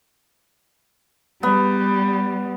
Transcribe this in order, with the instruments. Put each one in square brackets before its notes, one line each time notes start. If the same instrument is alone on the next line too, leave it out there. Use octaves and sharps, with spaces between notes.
[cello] G3 [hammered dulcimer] B3